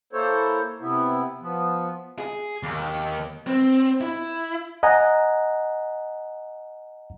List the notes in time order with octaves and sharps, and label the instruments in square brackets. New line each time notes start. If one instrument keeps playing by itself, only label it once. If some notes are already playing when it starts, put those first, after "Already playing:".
[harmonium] A#3 E4 A4 C5 C#5
C3 B3 E4
F3 B3
[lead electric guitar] G#4
D#2
C4
E4
[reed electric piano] D#5 F#5 G#5 A#5